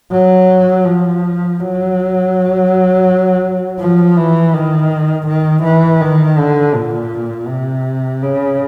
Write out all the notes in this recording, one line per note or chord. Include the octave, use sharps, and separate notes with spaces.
F#3
F3
F#3
F3
E3
D#3
D#3
E3
D#3
D3
A#2
C3
C#3